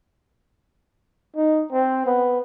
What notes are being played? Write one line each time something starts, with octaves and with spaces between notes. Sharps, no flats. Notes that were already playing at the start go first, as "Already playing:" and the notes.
D#4
C4
B3